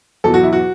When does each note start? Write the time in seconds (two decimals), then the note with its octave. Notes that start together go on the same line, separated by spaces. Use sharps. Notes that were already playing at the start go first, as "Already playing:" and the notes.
0.24 E2 B2 F#3 A4
0.34 F#4
0.43 E4
0.53 F#4